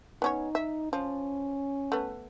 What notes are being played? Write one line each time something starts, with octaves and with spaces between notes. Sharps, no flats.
B3 C#4 D#4 C#5
E5
F3 C#4
A3 B3